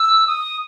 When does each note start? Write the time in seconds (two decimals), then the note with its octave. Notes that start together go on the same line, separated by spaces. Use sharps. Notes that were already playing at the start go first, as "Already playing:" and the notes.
Already playing: E6
0.27 D#6